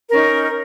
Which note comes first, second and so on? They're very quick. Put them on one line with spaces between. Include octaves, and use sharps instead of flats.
A#4 C#4 D#4